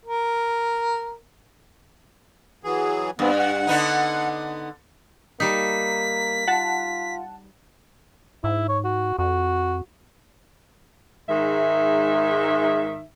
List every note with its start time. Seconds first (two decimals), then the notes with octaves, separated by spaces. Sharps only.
0.05 A#4
2.64 E3 F#3 G#4
3.19 G2 B3 C4
3.39 F#5
3.67 D3 B3 D#4
5.40 G3 A#3 D#4 B6
6.47 F4 F#5 A5
8.44 G#2 E4
8.69 C#5
8.84 F#4
9.18 F2 F#4
11.29 G#2 D#3 G#3 E5